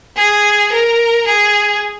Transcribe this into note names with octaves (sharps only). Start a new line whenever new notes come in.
G#4
A#4
G#4